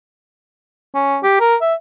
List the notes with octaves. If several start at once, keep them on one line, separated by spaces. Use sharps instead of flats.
C#4
G4
A#4
E5